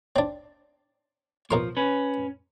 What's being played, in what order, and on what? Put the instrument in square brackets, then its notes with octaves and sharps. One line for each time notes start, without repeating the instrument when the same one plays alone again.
[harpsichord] C4 D4
[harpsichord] B2 A#4 C6 [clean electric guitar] F3
[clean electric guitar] C#4 B4